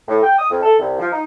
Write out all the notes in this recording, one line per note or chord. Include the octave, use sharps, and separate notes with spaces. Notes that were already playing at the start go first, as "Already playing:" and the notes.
A2
G5
D#6
F2
A4
C2
F3
D#4